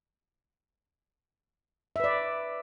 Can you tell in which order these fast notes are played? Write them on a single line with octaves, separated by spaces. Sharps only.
E5 B4 D5